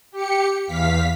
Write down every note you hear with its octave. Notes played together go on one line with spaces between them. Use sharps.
G4 C#7
E2 F5 B6